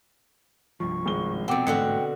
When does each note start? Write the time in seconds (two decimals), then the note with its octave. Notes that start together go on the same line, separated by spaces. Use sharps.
0.80 C2 G2 F3 C#6
1.06 G#1 G#3 G7
1.48 F1 F2 B2 C4 F#5 G5 D6 C#7
1.67 A1 G#2 B2 D3 A3 F#4 C#7